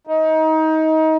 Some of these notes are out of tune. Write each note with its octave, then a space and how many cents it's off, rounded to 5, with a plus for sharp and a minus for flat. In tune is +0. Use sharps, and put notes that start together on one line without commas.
D#4 +25